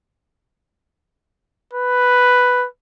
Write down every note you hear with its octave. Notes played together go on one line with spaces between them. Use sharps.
B4